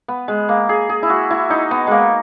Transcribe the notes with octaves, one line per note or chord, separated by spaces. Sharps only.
B3
G#3
A#3
G#4
G#4
E4
F#4
E4
D#4
B3
G#3 A#3